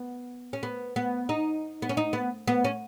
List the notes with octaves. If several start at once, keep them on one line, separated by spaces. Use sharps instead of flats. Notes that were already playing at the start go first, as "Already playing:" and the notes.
Already playing: B3
C#4
B3
B3
D#4
B3
C#4
D#4
B3
B3
C#4